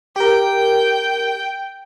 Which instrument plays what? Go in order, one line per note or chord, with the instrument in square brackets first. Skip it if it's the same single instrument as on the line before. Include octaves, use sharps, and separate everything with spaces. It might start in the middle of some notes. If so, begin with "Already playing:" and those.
[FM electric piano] G4 A#4 [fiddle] G5